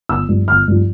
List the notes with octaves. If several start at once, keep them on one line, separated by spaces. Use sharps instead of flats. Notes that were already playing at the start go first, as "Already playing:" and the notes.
G1 E6
G2 F3
G1 F6
G2 F3